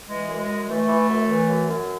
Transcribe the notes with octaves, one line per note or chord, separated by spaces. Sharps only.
E3 G#3
F#2
G#3
F#2
G#3
E3 A3
E3
F#2
E3
F#2
F#2